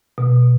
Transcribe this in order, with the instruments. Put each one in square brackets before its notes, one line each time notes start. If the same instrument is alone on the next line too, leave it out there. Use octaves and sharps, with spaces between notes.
[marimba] B2